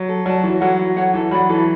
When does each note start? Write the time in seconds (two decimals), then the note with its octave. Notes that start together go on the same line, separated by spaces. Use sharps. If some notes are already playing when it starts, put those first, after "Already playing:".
Already playing: F#3
0.09 A4
0.26 F#3 D5 A5
0.43 E3 F#4
0.61 F#3 A4 C#5 F#5
0.79 F#4
0.96 A4 C#5 F#5
1.14 E3 A4
1.31 F#3 D5 F#5 B5
1.49 E3 A4